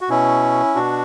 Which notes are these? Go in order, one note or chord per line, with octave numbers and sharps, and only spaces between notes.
F#4
B2 C#4 E4
B2 D4 F#4